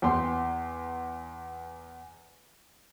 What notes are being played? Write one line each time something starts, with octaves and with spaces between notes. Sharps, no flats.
E2 G5 C6